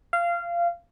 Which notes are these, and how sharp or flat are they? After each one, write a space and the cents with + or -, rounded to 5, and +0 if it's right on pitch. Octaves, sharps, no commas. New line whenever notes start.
F5 -20